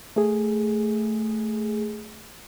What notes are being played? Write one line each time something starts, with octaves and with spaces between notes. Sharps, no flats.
A3 G#4